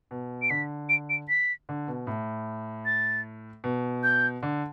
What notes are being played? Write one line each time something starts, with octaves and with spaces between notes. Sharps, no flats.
B2
D7
D3 B6
D7
D7
B6
D3
B2
A2
A6
B2
G6
D3